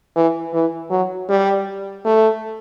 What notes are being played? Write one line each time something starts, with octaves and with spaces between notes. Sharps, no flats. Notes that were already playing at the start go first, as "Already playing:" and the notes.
E3
E3
F#3
G3
A3